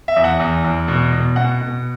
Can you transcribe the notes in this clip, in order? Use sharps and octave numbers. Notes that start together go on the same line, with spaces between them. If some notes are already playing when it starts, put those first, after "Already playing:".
E5
E2
F#5
E2
E2
B2
B2
B2 F#5
B2